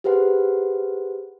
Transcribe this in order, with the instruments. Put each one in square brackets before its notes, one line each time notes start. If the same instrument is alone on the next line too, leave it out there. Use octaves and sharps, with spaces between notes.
[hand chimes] G4 G#4 B4 C5 F#5